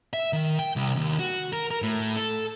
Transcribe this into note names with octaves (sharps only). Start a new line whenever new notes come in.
E5
D#3
G5
C2
D#2
F#4
A#4
A#4
A2
A4